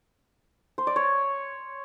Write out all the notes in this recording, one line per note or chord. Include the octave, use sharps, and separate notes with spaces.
C5
D5
C#5